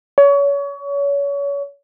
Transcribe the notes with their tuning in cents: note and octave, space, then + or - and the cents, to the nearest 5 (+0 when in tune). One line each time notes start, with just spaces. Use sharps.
C#5 +30